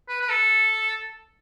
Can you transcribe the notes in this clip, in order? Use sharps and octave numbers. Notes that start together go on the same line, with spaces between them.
B4
B4
A4